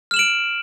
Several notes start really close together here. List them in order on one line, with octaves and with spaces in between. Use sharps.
F6 E7 F#7 D7